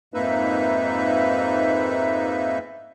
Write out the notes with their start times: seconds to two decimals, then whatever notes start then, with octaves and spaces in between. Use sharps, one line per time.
0.14 F2 G#2 A#3 D#4 B4 E5